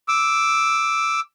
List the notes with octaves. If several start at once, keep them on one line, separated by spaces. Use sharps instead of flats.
D6 E6